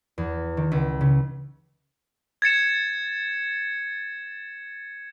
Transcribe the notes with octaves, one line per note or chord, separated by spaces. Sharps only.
E2
D#3
C#2
C#3
G#6 A6 C#7 E7